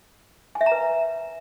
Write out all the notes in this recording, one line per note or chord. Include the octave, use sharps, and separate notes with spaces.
G#5
E5
A#5
B4